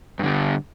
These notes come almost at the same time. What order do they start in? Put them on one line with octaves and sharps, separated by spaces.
G2 D3 G3